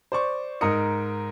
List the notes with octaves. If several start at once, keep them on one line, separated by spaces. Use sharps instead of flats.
C5 D5 C#6
G#2 D#4 A#4 D#5 D#6 C#7